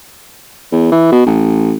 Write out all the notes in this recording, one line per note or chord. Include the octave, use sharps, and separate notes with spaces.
E2
E3
B2
A1